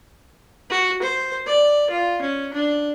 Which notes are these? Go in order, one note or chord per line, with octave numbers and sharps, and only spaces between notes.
F#4
C5
D5
F4
C#4
D4